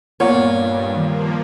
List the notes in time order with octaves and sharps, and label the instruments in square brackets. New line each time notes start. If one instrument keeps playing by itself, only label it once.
[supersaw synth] G2 [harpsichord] A#2 [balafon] A#3 B3 F#5 [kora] C#5
[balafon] D#3 [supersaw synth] F3 A#3